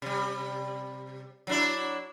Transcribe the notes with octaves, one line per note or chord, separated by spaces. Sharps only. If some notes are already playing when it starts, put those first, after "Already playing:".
C3 G3
F#3 D4 E4